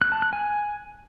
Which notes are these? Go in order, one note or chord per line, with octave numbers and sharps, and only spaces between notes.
F#6
A5
F#6
G#5